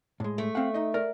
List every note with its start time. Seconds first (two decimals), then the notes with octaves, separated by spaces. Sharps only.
0.20 A2 G#3
0.38 A3
0.55 C4 F5 F#5
0.74 D#4 D#5
0.94 A#4 D5